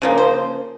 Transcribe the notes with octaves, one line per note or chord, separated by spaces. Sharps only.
C#3 F3 A#3
C5